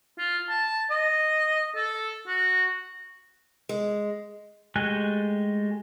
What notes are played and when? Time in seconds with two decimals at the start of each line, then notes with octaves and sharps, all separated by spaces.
0.18 F4
0.49 A5
0.90 D#5
1.75 A4
2.27 F#4
3.69 G#3
4.76 G#3 A3 G4 G#5 F#6